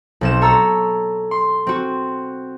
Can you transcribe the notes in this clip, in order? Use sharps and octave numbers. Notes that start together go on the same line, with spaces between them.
B1 C4 E7
A4 C#5 A#5 E6
C6
C4 F#4